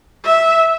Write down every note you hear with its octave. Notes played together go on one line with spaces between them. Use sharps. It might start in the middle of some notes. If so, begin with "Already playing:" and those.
E5